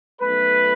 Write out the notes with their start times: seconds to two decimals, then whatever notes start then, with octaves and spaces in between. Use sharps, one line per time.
0.22 B1 B2 A3 B4